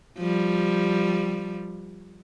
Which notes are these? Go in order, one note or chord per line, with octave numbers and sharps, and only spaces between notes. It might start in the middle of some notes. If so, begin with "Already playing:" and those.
F3 G3